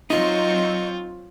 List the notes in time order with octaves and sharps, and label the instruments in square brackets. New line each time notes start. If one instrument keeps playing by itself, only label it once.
[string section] F#3 C4 C#6 [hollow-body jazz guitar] D#4 [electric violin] F4 [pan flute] D#5